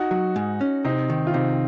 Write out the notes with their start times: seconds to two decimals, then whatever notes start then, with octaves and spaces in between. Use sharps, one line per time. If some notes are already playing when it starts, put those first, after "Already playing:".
Already playing: D#4 F#4
0.11 F#3
0.36 G#2
0.61 C#4
0.84 C3 C4 D#4
1.10 D#3
1.27 F4
1.34 C3 C4 D#4